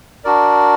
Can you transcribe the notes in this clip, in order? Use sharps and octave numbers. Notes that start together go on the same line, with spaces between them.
D4 F#4 A#4 D5